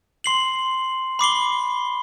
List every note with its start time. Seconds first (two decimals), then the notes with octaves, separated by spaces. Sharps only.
0.24 C6 C7 F#7
1.19 B5 D6 C7 G7